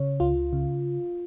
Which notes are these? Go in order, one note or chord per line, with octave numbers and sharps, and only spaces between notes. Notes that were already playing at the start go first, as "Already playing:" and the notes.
Already playing: C#3 C#5
C#2 F4
C#3